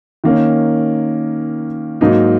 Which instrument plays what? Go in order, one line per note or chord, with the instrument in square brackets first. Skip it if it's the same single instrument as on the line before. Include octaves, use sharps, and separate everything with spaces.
[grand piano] D#3 A#3 C#4
G#2 F#3 A#3 D#4